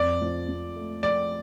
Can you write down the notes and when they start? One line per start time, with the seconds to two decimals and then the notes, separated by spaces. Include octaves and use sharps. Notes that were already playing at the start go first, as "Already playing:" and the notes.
Already playing: F2 D5
0.21 F3
0.48 F2
0.76 A3
1.03 F3 D5